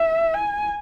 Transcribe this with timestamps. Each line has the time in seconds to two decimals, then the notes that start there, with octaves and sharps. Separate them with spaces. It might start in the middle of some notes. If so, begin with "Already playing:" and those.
Already playing: E5
0.34 G#5